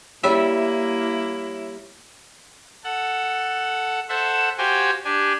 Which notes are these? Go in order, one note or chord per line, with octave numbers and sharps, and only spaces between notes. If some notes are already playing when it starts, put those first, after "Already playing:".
G3 A#3 E4 C#5 E5
A4 F#5
A4 C5 E5 F#5 A5
F#4 G4 C5 F5 G5 G#5
D4 G4 G#5